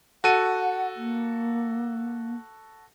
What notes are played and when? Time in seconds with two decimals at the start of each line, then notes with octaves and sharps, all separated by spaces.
0.24 F#4 A4 F#5 D#7
0.96 A#3